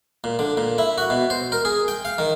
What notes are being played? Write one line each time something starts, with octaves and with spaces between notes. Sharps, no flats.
A#2
D3
A#2
E4
F#4
B2
C5
A#4
G#4
G5
F5
D#3